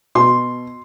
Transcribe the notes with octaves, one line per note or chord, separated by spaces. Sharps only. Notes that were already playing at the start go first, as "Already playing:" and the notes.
B2 C6